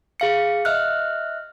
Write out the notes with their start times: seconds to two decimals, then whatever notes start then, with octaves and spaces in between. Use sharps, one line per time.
0.20 G#4 F5 C#7
0.65 D#5 E5 F6 F#6